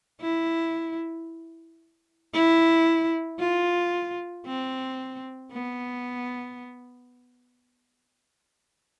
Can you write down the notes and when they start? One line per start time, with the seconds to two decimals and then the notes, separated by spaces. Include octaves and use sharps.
0.21 E4
2.34 E4
3.39 F4
4.46 C4
5.52 B3